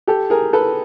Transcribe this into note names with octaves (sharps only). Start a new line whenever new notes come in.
G4 A4
G#4 A#4
A4 B4